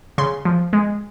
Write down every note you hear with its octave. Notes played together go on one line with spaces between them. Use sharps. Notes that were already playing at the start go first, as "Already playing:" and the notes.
C#3 C6
F3
G#3